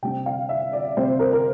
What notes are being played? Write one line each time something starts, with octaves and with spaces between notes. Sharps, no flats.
C3 G3 C4 G5
F5
E5
D5
C3 G3 C4 C5
A#4
A#4